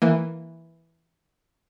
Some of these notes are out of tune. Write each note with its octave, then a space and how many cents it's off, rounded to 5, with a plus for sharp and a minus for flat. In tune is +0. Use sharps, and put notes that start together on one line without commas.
E3 +0 A#3 +0